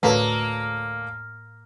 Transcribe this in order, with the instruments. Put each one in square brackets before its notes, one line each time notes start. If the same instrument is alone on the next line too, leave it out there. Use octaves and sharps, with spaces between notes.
[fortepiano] D2 A4 C#5 [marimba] A2 B4 A5 [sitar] A#3